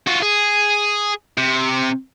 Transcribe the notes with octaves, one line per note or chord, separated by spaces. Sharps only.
F4 F#4
G#4
C3